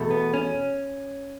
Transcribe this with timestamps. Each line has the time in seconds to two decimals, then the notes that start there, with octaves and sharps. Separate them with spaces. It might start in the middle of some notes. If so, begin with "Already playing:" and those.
Already playing: E2 B2 A3
0.11 B3
0.34 C#4